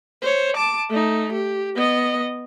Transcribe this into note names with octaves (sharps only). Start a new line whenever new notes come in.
C5 C#5
A5 D6
A3 D#4
G4
B3 D#5